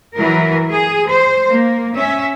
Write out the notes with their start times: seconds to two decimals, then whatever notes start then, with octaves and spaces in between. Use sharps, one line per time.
0.15 E3 F#3 A#4
0.71 G#4
1.09 C5
1.49 A#3
1.94 C#4 E5